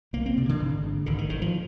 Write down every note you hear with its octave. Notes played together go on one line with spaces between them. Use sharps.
C2 A#3
C4
C3
D3
G#1
G#2
G#1 D3
D#3
G#2 D#3
F3